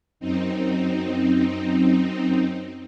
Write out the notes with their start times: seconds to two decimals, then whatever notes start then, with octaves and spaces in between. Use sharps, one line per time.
0.20 F#2 C4 D#4